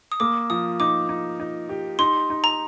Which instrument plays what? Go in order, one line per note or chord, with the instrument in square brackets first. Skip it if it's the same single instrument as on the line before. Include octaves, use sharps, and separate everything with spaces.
[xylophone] D#6
[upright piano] A#3 [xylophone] D6
[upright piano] F3 [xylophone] D#6
[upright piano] D#4 [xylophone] D6
[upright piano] D#4
D#4
G4
[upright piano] D#4 [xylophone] C6
[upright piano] D#4
[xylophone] A#5